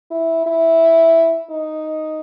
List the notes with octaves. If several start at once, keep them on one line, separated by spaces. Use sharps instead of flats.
E4
E4
D#4